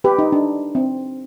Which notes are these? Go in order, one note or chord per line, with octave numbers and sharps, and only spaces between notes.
G4 B4
D#4
D4
C4